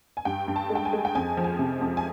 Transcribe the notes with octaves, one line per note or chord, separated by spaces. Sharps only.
G#5
G2 G5
G2
A5
G#3
G5
G#5
G#3
G5
F2 G#5
F3
G#5
C3
F2
G#5